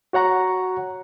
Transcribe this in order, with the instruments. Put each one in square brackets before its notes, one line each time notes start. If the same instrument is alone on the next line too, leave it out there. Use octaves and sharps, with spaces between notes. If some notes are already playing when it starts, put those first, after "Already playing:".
[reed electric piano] F#4 C#5 F#5 A#5 C#6